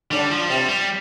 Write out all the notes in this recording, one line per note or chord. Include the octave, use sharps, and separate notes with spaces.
D3 G3 D4
F3
C3 G3 C4
G3